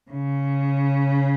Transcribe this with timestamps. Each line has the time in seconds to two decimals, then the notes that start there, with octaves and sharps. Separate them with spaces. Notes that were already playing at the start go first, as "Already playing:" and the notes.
0.11 C#3